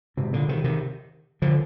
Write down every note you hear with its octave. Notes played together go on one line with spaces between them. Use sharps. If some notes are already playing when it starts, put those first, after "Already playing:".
G#2 C3
A#2 D3
C3 D#3
C3 D#3
D3 F3